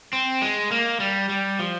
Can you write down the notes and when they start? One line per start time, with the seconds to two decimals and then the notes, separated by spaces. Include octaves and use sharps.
0.13 C4
0.42 G#3
0.71 A#3
1.00 G3
1.29 G3
1.59 F3